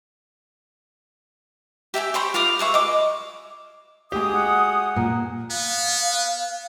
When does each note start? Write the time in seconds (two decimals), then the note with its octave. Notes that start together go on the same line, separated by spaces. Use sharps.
1.94 G4 E5 G5 G#5
2.14 G4 C5 B5 C#6
2.34 F4 F5 D6 D#6
2.59 G#4 B4 E5 C#6
2.74 D#5 D6
4.12 G#3 F#4 G4 G#5 D#6
4.33 F#5
4.96 A#2
5.50 B3 F5